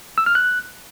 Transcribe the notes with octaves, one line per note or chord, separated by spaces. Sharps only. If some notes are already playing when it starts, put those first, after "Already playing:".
E6
F6
F#6